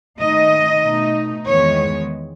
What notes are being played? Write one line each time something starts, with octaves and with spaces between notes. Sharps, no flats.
D#3 A3 D#4 D#5
B2 A3 D#4
E2 D#3 G#3 B3 C#5